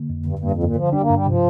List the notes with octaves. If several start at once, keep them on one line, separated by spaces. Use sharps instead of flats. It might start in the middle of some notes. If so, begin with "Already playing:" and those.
Already playing: D3 A#3
F2
G2 D3
G2 A#3
F2
G2 A#2
D3 F3
G3 D4
A#3
G2 G3
C3 F3